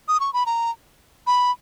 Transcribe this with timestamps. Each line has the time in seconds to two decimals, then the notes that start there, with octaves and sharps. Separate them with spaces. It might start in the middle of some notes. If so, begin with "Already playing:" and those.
0.08 D#6
0.20 C#6
0.33 B5
0.46 A#5
1.27 B5